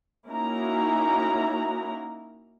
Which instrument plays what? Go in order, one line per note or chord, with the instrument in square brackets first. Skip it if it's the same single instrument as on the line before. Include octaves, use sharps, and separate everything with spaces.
[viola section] A#3 C#4 D#4 E4 F#4 A#5